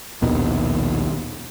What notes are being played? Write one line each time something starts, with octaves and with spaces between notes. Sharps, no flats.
A#1 D#2 B2 D#3